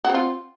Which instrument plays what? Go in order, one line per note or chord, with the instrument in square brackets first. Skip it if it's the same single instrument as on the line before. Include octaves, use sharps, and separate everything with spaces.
[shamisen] F#4
C4
F4